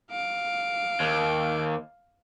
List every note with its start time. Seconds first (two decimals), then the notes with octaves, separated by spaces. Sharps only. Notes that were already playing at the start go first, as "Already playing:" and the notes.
0.11 F5 D7
1.00 D#2